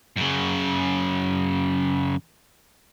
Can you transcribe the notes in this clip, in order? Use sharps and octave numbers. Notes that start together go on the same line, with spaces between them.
F#2 C#3